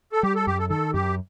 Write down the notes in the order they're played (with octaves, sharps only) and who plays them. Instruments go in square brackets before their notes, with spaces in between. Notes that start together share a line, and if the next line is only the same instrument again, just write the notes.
[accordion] A4
[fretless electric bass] G3 [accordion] G4
[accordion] A4
[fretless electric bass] F#2 [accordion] G4
[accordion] A4
[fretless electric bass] D#3 [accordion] A4
[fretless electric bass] F#2 [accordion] G4